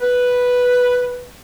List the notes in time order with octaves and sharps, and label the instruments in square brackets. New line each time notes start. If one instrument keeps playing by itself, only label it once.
[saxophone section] B4